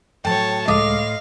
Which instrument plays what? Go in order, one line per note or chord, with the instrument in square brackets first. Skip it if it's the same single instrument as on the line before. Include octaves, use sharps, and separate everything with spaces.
[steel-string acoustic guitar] A2 F#3 [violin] C#5 A5 [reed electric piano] G5
[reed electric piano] C#2 G#3 [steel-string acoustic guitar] A2 F4 [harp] D#5 D6 [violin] F5